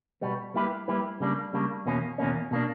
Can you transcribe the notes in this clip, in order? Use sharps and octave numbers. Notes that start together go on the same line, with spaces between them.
B2 G3 B3
G3 A#3 E4 G4 B4
G3 A#3 E4 G4 B4
C#3 G3 A#3 D4
C#3 G3 A#3 D4
E2 B2 A#3 C#4
E2 B2 A#3 C#4
B2 A#3 D4